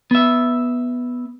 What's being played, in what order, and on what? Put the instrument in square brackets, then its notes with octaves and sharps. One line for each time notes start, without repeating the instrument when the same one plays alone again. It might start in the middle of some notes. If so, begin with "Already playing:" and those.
[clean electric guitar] B3 E5